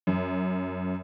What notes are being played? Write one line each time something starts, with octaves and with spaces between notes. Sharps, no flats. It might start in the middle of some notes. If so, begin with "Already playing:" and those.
F#2